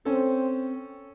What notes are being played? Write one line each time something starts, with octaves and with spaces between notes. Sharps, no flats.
C4 C#4 A4